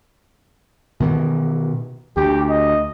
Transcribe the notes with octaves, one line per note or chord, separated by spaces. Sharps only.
B2 D#3 E3
D2 G4
D#5